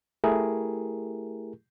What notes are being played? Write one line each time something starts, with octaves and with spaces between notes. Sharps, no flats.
A3 E4 G4 G#4 A#4